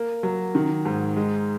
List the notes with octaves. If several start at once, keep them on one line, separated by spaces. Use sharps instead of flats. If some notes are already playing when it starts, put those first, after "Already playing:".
Already playing: A#3
F#3
D#3
G#2
G#3